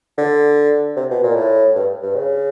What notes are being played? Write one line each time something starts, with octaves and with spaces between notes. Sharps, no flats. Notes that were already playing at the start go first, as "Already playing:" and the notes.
D3
C3
B2
A#2
A2
G2
G2
C#3